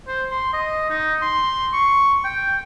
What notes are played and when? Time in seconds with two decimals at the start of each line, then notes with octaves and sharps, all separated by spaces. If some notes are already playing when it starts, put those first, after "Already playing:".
0.08 C5
0.31 C6
0.53 D#5
0.90 D#4
1.22 C6
1.73 C#6
2.25 G5